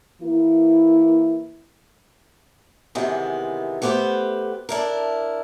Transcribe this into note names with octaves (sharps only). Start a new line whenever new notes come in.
E3 A#3 E4
C3 D#3 E3 G#3 B3
A3 B3 G4 B4 C5
D4 E4 A#4